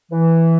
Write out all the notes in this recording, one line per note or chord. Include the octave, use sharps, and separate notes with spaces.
E3